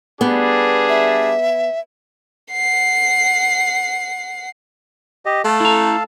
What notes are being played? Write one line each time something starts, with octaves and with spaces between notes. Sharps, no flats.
G3 B3 D4 G#4
E5
F#5 C7
G4 D#5
A3 A4 F5 A5
E4 A#5